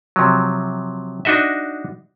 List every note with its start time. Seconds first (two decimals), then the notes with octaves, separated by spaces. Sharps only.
0.16 C3 F3 F#3
1.25 D4 D#4 F#4 D#5 E5